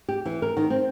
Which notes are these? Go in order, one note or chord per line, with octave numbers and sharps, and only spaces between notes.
G4
E3
A#4
D#3
C4